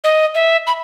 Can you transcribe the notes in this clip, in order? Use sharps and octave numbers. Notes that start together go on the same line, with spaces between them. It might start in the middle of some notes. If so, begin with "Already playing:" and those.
D#5
E5
B5